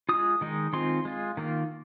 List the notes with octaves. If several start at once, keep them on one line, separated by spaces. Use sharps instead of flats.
G#3 F4 D#6
D#3 G#3 D#4
D#3 G#3 C4 F4 C6
G#3 F4
D#3 A#3 F4